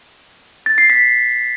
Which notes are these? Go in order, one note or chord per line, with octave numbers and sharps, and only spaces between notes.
A6
C7
B6